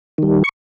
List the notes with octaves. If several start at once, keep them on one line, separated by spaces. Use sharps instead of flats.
D#3 G3
C#6